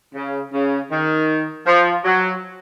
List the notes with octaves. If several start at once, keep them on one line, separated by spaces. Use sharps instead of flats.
C#3
C#3
D#3
F3
F#3